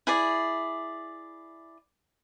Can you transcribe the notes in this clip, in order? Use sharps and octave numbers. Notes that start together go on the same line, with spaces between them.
E4 G#4 D5